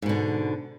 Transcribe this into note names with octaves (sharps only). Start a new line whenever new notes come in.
G#2 B2 D3